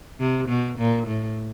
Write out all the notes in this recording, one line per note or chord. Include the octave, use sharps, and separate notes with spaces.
C3
B2
A#2
A2